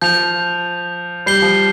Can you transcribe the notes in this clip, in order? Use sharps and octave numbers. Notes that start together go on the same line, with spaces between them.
F3 G6 F7
G3 G6 C7 G7
F3